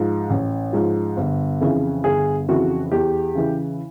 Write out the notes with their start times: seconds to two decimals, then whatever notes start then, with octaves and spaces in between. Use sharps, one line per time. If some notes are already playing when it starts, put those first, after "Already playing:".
Already playing: G#2 F3
0.30 A1
0.73 G#2 F3
1.17 G1
1.61 F2 C#3 E3
2.04 G1 G#4
2.48 F2 C#3 E3 F#4
2.92 E2 G4
3.35 C#3 E3